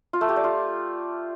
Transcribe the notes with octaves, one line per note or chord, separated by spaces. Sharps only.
F4
A3
G4
D5
F4